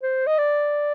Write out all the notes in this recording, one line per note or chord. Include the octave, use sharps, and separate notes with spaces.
C5
D#5
D5